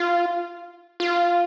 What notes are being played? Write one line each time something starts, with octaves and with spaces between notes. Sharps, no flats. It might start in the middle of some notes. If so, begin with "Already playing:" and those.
Already playing: F4
F4